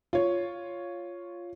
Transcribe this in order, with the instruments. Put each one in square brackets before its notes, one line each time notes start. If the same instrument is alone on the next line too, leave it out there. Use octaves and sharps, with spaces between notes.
[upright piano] F4 C#5